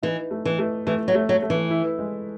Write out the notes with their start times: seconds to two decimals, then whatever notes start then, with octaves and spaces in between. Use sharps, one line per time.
0.03 E3 D#4
0.31 A3
0.45 E3
0.59 A3
0.87 E3 A3
1.08 F#3
1.15 A3
1.29 F#3
1.43 A3
1.50 E3
1.70 E4
1.99 G#3